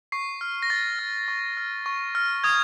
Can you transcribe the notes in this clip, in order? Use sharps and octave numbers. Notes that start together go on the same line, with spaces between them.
C#6 C7
F6
A#6
C#6 A6
F6
C#6
F6
C#6
F6
D#6 G#6